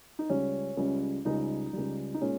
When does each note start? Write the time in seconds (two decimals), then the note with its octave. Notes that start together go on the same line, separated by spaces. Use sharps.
0.19 D#4
0.29 C#2 C#3 G3 C#4
0.77 C#2 C#3 G3
1.25 C#2 C#3 G3 D#4
1.73 C#2 C#3 G3
2.14 D#4
2.21 A#2 G#3 C#4